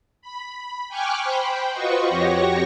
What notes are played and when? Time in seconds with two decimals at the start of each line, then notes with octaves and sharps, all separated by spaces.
0.22 B5
0.89 G5 G#5 C#6 D6 F6 F#6
1.22 C5 G5 B5
1.73 F4 F#4 B4 C5 D#5 C#6
2.09 F2 F#4 G4 C#5 C#6 A#6